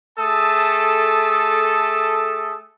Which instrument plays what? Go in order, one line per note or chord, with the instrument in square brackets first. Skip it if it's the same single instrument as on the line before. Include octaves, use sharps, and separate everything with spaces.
[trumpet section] A3 G#4 A4 A5 D#6